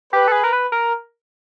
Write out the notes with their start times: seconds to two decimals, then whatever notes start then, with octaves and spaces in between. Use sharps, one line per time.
0.12 G4 B4
0.28 A4
0.32 G#4
0.44 A#4
0.53 B4
0.72 A#4